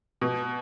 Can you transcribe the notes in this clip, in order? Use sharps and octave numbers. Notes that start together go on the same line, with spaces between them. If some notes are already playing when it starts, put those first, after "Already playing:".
B2